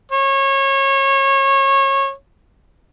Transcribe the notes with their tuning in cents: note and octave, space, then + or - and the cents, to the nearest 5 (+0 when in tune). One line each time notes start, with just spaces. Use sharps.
C#5 -25